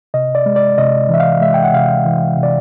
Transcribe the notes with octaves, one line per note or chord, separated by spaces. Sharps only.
C3 D#5
D5
G#3
D5
C3 D#5
E3 E5
F5
G#3 E5
G5
F#5
C3 F5
E3
C3
D5